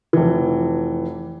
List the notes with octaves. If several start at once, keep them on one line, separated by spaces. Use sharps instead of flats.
F1 E3